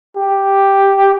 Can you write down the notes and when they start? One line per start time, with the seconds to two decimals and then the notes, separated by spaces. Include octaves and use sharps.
0.17 G4